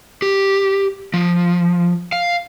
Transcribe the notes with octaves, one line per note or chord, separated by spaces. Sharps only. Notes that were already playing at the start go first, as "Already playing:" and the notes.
G4
F3
F5